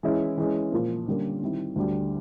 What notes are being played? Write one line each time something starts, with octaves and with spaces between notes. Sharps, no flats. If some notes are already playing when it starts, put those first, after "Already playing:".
E3 G#3 C#4 E4
E3 G#3 C#4
A#2 F3 A#3
D3 G3 A#3 C#4
D#3 G3 C4 E4
D2 D3 G3